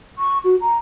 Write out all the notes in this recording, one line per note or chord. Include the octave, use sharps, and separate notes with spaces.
C#6
F#4
A#5